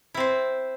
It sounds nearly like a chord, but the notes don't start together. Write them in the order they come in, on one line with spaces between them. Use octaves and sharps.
E4 C4 C5